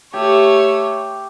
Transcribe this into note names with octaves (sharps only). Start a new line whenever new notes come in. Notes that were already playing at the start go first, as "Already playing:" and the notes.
A3 G4 C#5